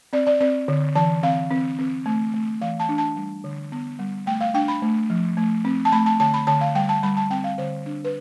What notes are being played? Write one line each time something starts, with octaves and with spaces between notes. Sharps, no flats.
C4 D5
D5
C4 D5
D3
E3 A5
C4 F5
C4
C4
A3
A3
E3 F5
A5
D4
A5
G3
D3
B3
G3
A3 G5
F5
D4 G5
B5
A3
F3
A3
C4
A5
A3 B5
A5
D3 A5
B5
D3 A5
F5
G3 G5
A5
G3 B5
A5
C4 G5
F5
D3 C5
D4
B4